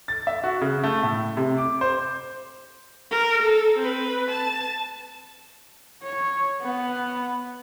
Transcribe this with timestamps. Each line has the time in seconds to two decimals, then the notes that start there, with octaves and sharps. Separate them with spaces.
0.08 A6
0.27 E5
0.44 F#4
0.61 C#3
0.84 A3
1.03 A2
1.37 C3
1.58 D6
1.81 C5
3.11 A#4
3.42 A4
3.78 C4 B4
4.31 A5
6.03 C#5
6.61 B3